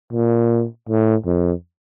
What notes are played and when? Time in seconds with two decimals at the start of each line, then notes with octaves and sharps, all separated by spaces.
0.13 A#2
0.89 A2
1.26 F2